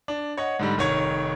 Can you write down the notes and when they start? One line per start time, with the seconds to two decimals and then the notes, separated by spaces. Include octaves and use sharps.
0.08 D4
0.37 C#5 D#5 F#5
0.59 G#2 D3 G3
0.77 F1 D#3 C#5 G#6